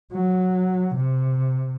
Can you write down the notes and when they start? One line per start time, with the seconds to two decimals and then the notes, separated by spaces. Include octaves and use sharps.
0.13 F#3
0.96 C3